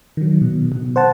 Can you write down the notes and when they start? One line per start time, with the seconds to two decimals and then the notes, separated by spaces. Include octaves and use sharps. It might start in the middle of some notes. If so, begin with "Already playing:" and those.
0.17 D#3 F#3
0.42 B2
0.72 B2
0.96 C5 F#5 A5